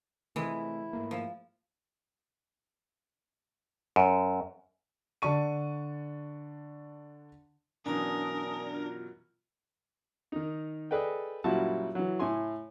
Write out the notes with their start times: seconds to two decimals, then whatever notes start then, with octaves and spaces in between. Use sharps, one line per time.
0.36 C3 E3 G#3 A3 E4
0.93 G#2 A3 A#3
1.11 F3
3.96 F#2
5.22 D3 D4 A5 C#6 D#7
7.86 F#2 B2 E3 D4 A#4 G#5 A5 D#6
8.75 F4
10.32 D#3 D#4
10.91 G#4 A4 B4 D5 D#5 G5
11.44 F#2 A#2 G3 E4 F#4 A5
11.95 E3 F#3
12.20 A2 E4 G#5 C6